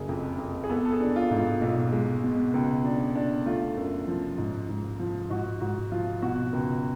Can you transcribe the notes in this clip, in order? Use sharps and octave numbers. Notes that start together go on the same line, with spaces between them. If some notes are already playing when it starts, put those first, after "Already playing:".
Already playing: F#1 F#3 G#4
F2
F2
G#4
B3 A4
A4
G#4
D4
F4
G#2
F4
B1 F4
G#3
B2
C#2
D4
D4
A3 F4
F#2
F3
G#2
G#2
F3
G#2 F#4
G#2 F#4
F3 F4
B2 F#4
C#2